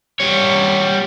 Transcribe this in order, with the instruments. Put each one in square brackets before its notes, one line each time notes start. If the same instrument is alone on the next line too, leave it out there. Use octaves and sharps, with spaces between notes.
[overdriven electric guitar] G3 C#5